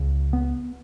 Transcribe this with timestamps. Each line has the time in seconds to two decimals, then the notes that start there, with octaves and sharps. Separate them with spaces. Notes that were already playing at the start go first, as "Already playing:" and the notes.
Already playing: C#2
0.33 B3